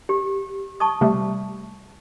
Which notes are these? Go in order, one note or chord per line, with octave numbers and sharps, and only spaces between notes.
G4
A5 C#6 D#6
C3 G3 A3